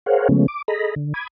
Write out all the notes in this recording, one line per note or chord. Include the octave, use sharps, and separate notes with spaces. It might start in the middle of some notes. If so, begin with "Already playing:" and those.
G#4 A#4 C5 C#5 F5 F#5
C#3 F3 G#3 A3 B3 C#4
D6
G#4 A4 D#5 A#5 B5
D3
B5 D6 D#6 G#6